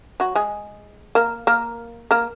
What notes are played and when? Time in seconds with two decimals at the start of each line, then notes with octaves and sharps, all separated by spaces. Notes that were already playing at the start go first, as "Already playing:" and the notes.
0.20 F#3 F#4
0.35 G#3 G#4
1.15 A#3 A#4
1.47 A#3 A#4
2.11 A#3 A#4